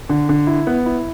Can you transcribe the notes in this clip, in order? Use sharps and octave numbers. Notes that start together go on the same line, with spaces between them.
D3
D3
E4
B3
E4